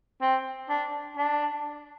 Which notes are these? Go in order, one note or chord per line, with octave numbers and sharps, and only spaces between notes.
C4
D4
D4